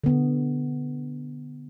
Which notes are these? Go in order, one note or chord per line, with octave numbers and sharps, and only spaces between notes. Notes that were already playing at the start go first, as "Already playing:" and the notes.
D3 B3